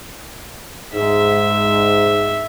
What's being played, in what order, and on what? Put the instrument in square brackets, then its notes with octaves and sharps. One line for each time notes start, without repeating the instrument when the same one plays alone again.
[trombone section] G#2 [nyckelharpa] E5